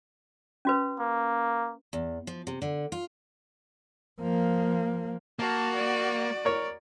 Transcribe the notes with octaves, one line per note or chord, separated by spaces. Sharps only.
C#4 F#4 B4
A#3
E2
F3
C3
D3
F4
F3 A#3
A#3 F#4 A5
D5
A#4 C#5